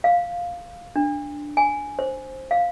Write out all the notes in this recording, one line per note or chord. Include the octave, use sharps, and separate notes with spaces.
F5
D4
G#5
C5
F5